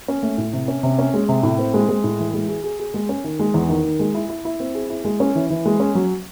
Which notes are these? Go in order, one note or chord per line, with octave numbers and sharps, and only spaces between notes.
C#4
A3
A2
C3
C#4
C3
C#4
G#3
C3
A2
C4
G#3
G#3
A2
E3
G#3
G#4
G#4
G#4
G#3
C#4
D#3
G#3
E2
D#3
D#3
G#3
E4
E4
E4
C4
G#4
E4
G#3
C#4
E3
E3
G#3
C#4
F#3